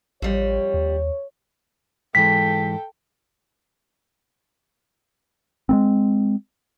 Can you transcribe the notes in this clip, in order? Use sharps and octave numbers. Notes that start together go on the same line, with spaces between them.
A1 F2 G3 C#5
D#2
G#2 E3 G#3 A4 G5 B6
G#3 B3 C4